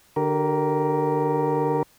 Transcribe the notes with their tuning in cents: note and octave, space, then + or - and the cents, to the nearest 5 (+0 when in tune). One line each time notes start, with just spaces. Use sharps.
D3 +20 G4 -25 A#4 +5